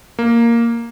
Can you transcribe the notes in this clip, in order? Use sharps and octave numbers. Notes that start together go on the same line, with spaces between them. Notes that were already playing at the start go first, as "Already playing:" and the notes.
A#3